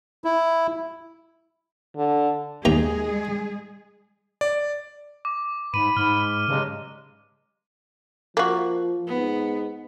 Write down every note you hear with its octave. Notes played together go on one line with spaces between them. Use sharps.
E4
D3
D#2 G#3 G#4 A#5
D5
D6
G#2 B5 D#7
G#2 F6
G2 C#3 F#3 G#3
F3 A#3 F#4
G#2 B3